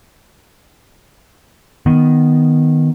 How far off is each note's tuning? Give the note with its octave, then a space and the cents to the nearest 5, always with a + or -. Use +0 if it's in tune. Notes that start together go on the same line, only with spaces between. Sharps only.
D#3 +0 B3 +0